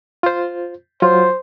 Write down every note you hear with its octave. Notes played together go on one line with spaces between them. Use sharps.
F4 C5
F#3 F4 C5